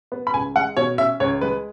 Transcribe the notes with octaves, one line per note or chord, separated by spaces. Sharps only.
B3
B5
C#2 G#5
G#3 F#5
B2 C#5
C#4 E5
C#2 C#5
G#3 B4